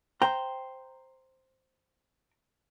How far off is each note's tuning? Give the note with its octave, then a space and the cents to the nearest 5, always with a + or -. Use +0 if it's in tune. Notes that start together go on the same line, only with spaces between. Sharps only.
C5 +0 G5 +0 A#5 -10